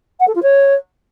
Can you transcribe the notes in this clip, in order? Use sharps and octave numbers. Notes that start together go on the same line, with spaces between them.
F#5
A4
F4
C#5